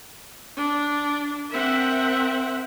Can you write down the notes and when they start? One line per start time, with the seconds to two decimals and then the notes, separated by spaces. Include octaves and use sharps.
0.57 D4
1.51 C4 A#4 E5 F#5